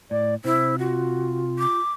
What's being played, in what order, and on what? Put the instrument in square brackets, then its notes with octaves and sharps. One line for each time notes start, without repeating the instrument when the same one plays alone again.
[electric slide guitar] A2 [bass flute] D5
[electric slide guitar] C3 [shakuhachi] E4 [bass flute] C5
[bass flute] F4 [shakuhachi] F#4
[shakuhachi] D6